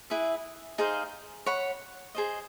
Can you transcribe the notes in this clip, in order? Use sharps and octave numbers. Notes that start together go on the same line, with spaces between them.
E4 G#4 B4 E5
D#4 G#4 C5 F5
C#5 F#5 B5
G#4 C5 D#5